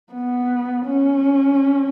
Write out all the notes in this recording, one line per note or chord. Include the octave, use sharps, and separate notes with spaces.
B3
C#4